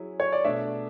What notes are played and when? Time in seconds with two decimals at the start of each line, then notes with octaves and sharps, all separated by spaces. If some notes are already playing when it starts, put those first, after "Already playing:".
Already playing: F#3 C#4 E4 G#4
0.20 C#5
0.32 D5
0.44 B2 A3 D4 E5